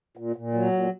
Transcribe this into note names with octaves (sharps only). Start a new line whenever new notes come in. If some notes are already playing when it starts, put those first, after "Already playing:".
A#2
A#2
F#3
A#2